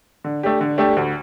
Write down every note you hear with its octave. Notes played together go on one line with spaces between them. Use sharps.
D3
A3 D4 G4
D3
A3 D4 G4
D2